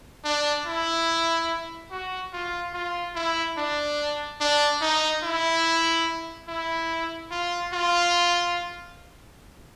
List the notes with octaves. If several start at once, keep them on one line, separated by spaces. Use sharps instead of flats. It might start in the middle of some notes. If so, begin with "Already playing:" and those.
D4
E4
F#4
F4
F4
E4
D4
D4
D#4
E4
E4
F4
F4